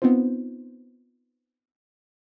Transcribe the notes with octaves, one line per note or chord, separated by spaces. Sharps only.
B3 C4 D#4 F4 C5